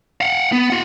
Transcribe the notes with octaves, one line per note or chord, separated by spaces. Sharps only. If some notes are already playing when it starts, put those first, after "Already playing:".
F5 F#5
B3
F4 F#5